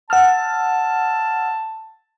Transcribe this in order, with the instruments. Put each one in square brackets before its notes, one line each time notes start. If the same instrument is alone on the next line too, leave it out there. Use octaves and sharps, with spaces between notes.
[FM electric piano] F#5 E6 F6 [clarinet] A5